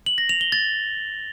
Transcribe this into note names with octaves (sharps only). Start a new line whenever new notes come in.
F#7
A#6
F7
G7
A6